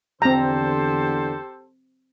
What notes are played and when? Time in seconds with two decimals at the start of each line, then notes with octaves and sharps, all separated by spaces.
0.22 E2 D3 C4 G4 A4 C5 A#5